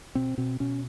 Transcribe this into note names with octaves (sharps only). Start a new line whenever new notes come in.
B2 C4
B2 C4
B2 C#4